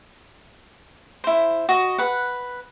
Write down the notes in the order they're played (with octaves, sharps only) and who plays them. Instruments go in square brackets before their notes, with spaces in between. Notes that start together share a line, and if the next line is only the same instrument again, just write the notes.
[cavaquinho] E4 C5
F#4 D#5
B4 F#5